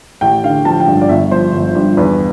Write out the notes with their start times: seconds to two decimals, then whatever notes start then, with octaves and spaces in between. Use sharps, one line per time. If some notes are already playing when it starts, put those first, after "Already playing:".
0.21 A1 G5
0.43 D3 F5
0.65 F3 A5
0.80 G5
0.88 G2
1.02 D5
1.09 G1 E5
1.31 F3 C5
1.54 G1
1.75 G2
1.97 E2 B4